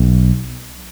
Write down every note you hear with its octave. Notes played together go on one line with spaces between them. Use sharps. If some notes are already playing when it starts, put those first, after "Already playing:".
Already playing: B1